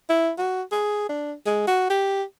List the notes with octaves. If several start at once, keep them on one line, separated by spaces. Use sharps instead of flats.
E4
F#4
G#4
D4
G#3
F#4
G4